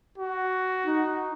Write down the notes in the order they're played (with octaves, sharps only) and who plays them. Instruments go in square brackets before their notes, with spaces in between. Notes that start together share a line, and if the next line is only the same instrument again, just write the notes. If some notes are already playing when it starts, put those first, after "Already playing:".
[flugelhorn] F#4
[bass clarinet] D#4